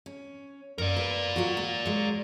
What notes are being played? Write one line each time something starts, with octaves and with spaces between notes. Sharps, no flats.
C#4
F#2 A#4 D5
B4
F#3 F4 F#4
A#3
F#3 G#3